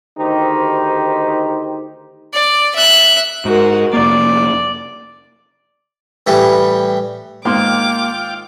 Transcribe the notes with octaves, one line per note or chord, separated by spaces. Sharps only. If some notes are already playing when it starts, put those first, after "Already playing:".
D2 D#3 D#4 G4 C5
D5
E5 F#6
G#2 F#4 A#4
F1 A#3 D5
A2 E3 G3
G#2 D#3 A#3 F4 F5 G5 C6 D6